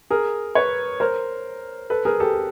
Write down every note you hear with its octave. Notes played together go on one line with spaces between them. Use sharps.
G#4 A#4
B4 C#5
A#4 C5
A4 B4
G#4 A#4
G4 A4